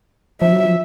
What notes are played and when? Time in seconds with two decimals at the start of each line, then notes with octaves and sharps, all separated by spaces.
0.41 F3 E5
0.53 F#3
0.65 F3